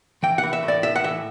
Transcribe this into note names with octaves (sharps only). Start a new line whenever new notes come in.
E3 G5
F#5
E3
E5
A2
D5
A2 E5
F#5
E3 E5